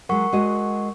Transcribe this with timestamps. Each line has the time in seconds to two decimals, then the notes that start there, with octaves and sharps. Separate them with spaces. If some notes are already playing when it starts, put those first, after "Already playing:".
0.09 F#3 G#3 A#4 F#5 C#6
0.33 G#3 F#4 D#5